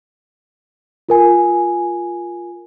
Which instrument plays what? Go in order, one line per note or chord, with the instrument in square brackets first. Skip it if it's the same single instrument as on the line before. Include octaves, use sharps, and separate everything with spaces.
[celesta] F4 A#4 G#5